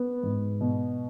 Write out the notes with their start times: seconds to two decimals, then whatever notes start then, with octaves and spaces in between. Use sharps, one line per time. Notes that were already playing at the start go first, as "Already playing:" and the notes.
Already playing: B3
0.23 G#2
0.61 B2